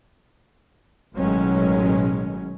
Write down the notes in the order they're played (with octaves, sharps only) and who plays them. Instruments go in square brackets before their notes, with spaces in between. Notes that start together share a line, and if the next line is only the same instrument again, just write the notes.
[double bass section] A1 B2 D#3 F#3 G#3 C#4